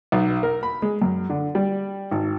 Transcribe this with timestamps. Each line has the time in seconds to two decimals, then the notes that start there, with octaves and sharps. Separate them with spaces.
0.12 B1
0.43 A#4
0.63 B5
0.82 G#3
1.02 F#2
1.30 D3
1.55 G3
2.11 G#1